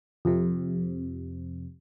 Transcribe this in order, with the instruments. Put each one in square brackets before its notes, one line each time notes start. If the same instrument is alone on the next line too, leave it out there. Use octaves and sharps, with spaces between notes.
[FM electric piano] F2 C3